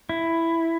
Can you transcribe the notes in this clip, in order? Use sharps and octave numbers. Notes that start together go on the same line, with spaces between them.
E4